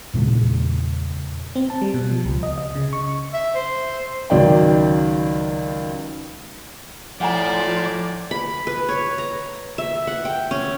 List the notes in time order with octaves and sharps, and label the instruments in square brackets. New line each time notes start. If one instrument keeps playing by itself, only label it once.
[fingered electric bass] E2 A#2 C#3 G#3
[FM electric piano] C4
A5
G3
B2
F3
C#2
D#5
D#5
C#3
C#6
[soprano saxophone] E5
C5
[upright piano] C#2 D#3 F#3 D5 G5
[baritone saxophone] A2 [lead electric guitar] F3 [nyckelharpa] D5 [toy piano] F#5 G#5 A#5
[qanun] B5
B4
C#5
A#5
E5
F#5
G5
C#4